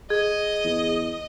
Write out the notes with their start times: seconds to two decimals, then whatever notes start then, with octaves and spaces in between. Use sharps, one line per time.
0.10 G#4 D#5
0.64 E2